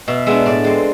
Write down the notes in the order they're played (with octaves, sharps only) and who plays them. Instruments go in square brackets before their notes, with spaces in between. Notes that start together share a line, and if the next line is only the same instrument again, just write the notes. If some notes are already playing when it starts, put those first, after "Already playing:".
[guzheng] B2 E5
G#3 B3 D4 E5
A2 D5
G#3 C4